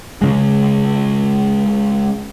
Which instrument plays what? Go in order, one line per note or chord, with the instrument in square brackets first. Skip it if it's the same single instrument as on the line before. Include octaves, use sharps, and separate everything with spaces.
[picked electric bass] C#3 G#3